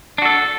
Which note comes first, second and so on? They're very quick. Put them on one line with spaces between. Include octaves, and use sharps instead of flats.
D4 F#4 A4